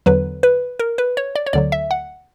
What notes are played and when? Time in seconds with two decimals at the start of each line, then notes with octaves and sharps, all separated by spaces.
0.06 E2 D3 F#3 B4
0.43 B4
0.79 A#4
0.98 B4
1.17 C#5
1.35 D5
1.46 C#5
1.53 D2 D3 F#3 D5
1.72 E5
1.91 F#5